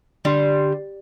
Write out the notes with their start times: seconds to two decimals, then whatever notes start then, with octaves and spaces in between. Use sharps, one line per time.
0.25 D3 G3 D4 C6